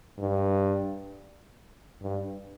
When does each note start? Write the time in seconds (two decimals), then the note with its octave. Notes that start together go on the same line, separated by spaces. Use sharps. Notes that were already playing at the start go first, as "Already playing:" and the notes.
0.18 G2
2.02 G2